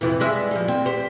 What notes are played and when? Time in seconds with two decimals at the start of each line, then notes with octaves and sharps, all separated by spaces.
0.01 F2 C3 E3
0.20 G3 G#3 E5
0.51 F3 G3
0.68 C4
0.86 G4 C5